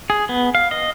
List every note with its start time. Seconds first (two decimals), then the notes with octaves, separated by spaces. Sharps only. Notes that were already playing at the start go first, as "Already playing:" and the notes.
0.10 G#4
0.29 B3
0.55 F5
0.71 D#5